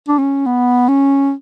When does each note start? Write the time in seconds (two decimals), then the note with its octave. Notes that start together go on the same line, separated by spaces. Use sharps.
0.08 D4
0.18 C#4
0.46 B3
0.88 C#4